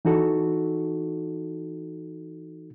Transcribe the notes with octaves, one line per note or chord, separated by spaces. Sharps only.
E3 D#4 F#4 A4